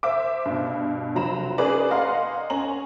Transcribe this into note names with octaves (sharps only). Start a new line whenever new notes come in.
C5 E5 D6
G2 B2
F1 F3 F#3 A#5 B5 E7
C#4 D#4 G#4 A#4 B4 D5
D#5 F5 F#5 A#5 C6
C#4 G#5 A#5 F#7